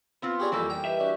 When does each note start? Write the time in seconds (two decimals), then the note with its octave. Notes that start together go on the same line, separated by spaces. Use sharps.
0.22 B3 C4 F4 F5
0.40 G4 G#4 D5 G#5 B5 C#6
0.52 F2 E3 G3 A#3 A4
0.70 G5 A#5
0.85 G4 B4 D#5 E5
1.00 D4 F#4 G4 C#6